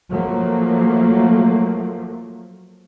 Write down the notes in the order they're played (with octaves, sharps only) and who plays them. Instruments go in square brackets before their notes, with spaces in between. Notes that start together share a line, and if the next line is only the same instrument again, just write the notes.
[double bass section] F3 F#3 A3 A#3